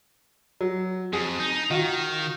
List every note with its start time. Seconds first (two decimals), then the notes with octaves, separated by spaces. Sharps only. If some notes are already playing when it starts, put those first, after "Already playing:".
0.61 F#3
1.13 F2 G#4
1.40 D#4
1.71 D#3 F4 F#4